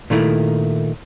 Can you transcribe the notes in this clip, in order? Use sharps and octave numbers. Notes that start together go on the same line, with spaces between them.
A#2 D#3 A3 E4